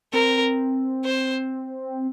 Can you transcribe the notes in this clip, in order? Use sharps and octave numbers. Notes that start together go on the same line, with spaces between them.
C4 A#4
C5